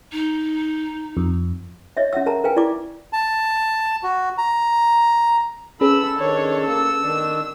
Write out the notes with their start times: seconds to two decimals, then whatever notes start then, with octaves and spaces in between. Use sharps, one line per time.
0.12 D#4
1.17 F2
1.97 C#5 D#5 E5
2.13 C#4 E5 F#5 E6
2.26 A#4 A5 A#5
2.44 A#4 B4 F5 G5 G#5
2.56 E4 D5 A5 D6
3.13 A5
4.03 F#4
4.38 A#5
5.81 C#4 G#4 A4 B4 B5 E6
6.19 D#3 D4 C#5
6.66 A#3 E6
7.02 D#3 D4